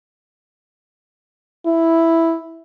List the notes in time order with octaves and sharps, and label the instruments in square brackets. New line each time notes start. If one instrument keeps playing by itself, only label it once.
[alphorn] E4